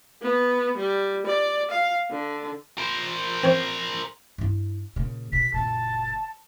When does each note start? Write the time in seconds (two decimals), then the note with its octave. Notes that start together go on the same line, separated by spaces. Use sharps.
0.22 B3
0.77 G3
1.26 D5
1.70 F5
2.11 D3
2.78 A#4 C5
3.44 C4 C#5
4.38 G2 E4
4.96 A#2 C#3
5.33 B2 D3 B6
5.54 F#1 A#2 A5